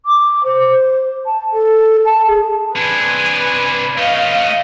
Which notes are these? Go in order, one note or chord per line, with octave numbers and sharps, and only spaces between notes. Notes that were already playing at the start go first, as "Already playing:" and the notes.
D6
C5
A5
A4
A5
G#4
C3 D4 B4 G#5
A3 C#4 D#5 F5